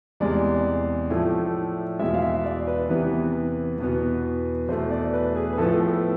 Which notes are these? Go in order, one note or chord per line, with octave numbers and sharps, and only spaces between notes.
E2 C3 G#3 D5
A2 F3 A3
E2 B2 G#3 E5
F5
E5
D5
B4
E2 C3 E3 B3
E2 B2 B3
E2 B2 A3 C5
D5
B4
G#4
B4
A2 F3 B3 A4